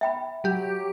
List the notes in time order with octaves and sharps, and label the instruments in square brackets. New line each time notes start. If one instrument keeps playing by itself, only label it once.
[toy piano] E5 G5 B5
[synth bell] F#3 G4